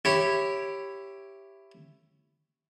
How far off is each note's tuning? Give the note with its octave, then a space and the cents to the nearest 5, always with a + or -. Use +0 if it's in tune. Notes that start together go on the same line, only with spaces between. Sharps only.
E4 +10 G4 +0 C#5 -10